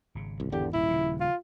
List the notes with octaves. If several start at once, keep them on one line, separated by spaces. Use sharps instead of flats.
G#1 C#3
C2
E2 D3 G4
D#1 E4
C#3 F3
F4